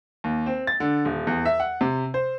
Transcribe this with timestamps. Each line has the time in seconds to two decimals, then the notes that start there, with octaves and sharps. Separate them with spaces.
0.24 D#2
0.46 C4
0.67 A6
0.80 D3
1.05 D#1
1.27 E2
1.45 E5
1.60 F#5
1.81 C3
2.14 C5